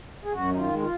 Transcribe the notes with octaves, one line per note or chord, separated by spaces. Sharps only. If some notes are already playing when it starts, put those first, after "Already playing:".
G#4
F#2 F#4
D#3 D#4
F4
G#3
F4